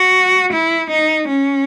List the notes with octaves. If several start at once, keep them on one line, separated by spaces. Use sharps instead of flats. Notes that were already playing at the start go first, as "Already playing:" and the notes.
Already playing: F#4
E4
D#4
C#4